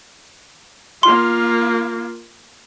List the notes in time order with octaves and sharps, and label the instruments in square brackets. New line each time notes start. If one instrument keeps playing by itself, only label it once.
[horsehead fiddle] A#3 F4 [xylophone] C6